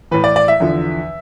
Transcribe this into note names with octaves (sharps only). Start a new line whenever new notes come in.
A2 E3 B4
D5
D5
E5
E2 D3 F3